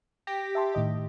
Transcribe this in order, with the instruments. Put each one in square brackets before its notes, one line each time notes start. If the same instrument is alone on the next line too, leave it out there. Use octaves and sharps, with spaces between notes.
[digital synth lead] G4 [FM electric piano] A#6
[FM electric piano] E5 A5 C6
A2 D#3 D#5